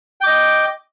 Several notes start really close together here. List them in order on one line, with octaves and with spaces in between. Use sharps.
G5 D6 D#5